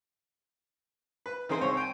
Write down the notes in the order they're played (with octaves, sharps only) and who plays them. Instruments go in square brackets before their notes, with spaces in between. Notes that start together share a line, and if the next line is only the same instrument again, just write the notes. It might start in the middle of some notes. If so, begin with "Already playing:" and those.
[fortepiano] B4
D#3 C4 D#4 G#4 C5
C2 C5 C#5
G5 G#5